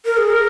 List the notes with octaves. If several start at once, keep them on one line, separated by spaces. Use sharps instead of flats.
A#4
G#4
A#4